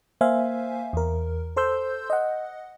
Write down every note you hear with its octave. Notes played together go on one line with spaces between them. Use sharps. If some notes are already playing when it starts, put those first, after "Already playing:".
A#3 C5 E5 F5 G#5
E2 A#4
A4 C5 C6 E6 G6
D#5 F#5